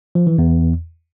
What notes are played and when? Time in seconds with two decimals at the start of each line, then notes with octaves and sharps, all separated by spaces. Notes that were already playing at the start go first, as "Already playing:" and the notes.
0.15 F3
0.27 E3
0.38 E2